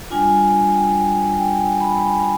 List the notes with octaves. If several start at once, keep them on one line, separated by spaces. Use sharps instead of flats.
G3 D4 F4 G#5
G5
G5
G#5
B5
G#5